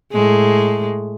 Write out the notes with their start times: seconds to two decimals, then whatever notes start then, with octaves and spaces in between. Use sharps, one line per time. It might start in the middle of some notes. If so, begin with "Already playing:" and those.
0.12 A2 G#3